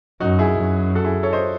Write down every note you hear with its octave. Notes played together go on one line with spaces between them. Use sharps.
F#2 D#4 F#4
E4 G#4
F#2
F#4 A4
E4 G#4
A4 C#5
C5 D#5